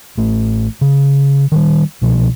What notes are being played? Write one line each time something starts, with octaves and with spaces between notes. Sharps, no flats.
A1 A3
C#3
D#3 F#3 G3
C2 B2 F3